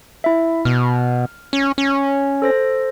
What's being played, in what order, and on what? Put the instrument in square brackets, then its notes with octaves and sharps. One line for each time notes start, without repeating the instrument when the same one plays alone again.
[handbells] E4 E5
[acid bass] B2 [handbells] F6
[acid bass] C#4
C#4
[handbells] A4 C5 A#6